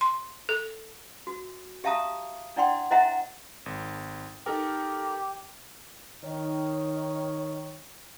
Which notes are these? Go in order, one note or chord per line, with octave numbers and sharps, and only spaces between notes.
C6
A4
F#4
G4 E5 F5 A5 A#5 D#6
D4 E4 D5 F#5 G5 C6
E4 C5 D#5 E5 F#5 A#5
G#1
D#4 G4 A4 A#4
D#3 C#5